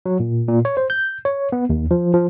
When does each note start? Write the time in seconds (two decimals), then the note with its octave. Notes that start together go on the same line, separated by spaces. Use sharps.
0.06 F#3
0.20 A#2
0.48 A#2
0.65 C#5
0.77 C5
0.90 G6
1.25 C#5
1.52 B3
1.70 D#2
1.91 F3
2.14 F3